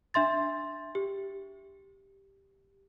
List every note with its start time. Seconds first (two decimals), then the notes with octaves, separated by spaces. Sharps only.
0.14 D4 E5 C6 A6
0.95 G4